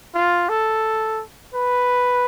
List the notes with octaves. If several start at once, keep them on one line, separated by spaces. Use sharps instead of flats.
F4
A4
B4